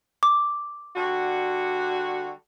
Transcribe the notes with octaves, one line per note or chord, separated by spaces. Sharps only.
D6
D3 G3 F#4